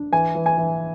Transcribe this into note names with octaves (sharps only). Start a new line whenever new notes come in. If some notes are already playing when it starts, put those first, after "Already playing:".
Already playing: D4
E3 G#5
E3
G#5
E3